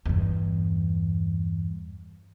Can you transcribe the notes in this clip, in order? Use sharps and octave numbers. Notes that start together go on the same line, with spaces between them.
E2 G2